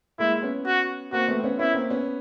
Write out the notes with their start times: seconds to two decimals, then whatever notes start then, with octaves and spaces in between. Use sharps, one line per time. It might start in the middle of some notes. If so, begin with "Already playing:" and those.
0.19 G#3 A#3 E4
0.42 B3 C#4
0.66 F#4
1.13 A#3 C4 F#4
1.28 A3 B3
1.39 C4
1.44 B3 C#4
1.59 B3 C#4 E4
1.74 A#3 C4
1.90 B3 C#4